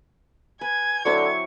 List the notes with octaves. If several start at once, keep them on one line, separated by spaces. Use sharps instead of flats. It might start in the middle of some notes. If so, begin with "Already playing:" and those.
B4 G#5 G#6
D3 F#3 C4 E4 C#6